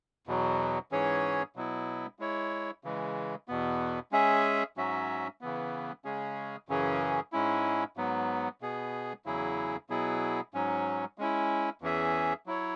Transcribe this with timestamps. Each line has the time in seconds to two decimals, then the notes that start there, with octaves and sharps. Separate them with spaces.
0.27 E2 B2 F#3
0.91 G#2 E3 C#4 G#4 C#5
1.56 B2 F#3 B3 E4
2.19 G#3 E4 C#5
2.84 C#3 E3 G#3
3.48 E2 B2 B3
4.12 G#3 C#4 G#4 E5
4.77 G#2 F#3 C#4 F#4 E5
5.41 C#3 E3 B3
6.05 C#3 G#3 C#4 G#4
6.69 F#2 C#3 E3 C#4 G#4
7.32 G#2 G#3 C#4 E4
7.97 G#2 F#3 B3
8.61 B2 B3 G#4
9.26 E2 C#3 F#3 E4 G#4
9.89 B2 F#3 B3 E4 G#4
10.54 G#2 F#3 C#4
11.18 G#3 C#4 E4
11.81 E2 E3 C#4 G#4 E5
12.46 F#3 E4 C#5